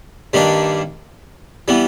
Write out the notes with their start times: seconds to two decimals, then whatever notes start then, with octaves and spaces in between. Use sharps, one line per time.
0.33 G2 D#3 G3 A#3 D4
1.68 E3 G3 B3